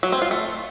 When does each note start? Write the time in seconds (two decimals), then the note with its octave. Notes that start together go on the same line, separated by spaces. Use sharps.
0.03 F#3
0.12 C4
0.22 F4
0.31 A3